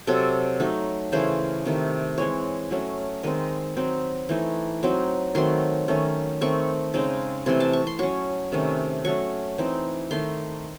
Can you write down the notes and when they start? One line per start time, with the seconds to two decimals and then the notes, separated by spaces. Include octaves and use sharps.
0.07 C3 F#3 C4 A4
0.60 F#3 A3 D#4
1.12 C#3 E3 A3 C5
1.65 C3 D#3 A3
2.18 E3 G#3 C4 C#5
2.71 F#3 A3 C#4
3.23 D#3 G#3 C4 D#5
3.76 F#3 C4 D#4
4.29 E3 A3 D#4
4.83 F#3 C4 D#4
5.35 D#3 F#3 A3 C4 C6
5.88 D#3 A3 C#4
6.41 D#3 A3 C4 C#6
6.94 C#3 G#3 C4 D#4
7.46 C3 E3 A3 C4 C6
7.60 A5
7.73 C#6
7.87 C6
7.99 F#3 C#4 C#6
8.52 C3 D#3 A3 C#4
9.05 F#3 A3 C#4 C#6
9.58 E3 C4 D#4
10.11 D#3 A3 D#4 C6